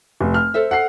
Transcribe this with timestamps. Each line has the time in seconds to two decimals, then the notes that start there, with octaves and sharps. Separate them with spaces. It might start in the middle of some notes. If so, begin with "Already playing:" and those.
0.21 F1
0.34 F6
0.54 A4 C5 E5
0.71 F#5 C7